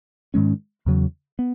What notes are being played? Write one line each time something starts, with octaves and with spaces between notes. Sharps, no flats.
G#2 D#3 G#3 C#4
E2 C#3 F#3
B3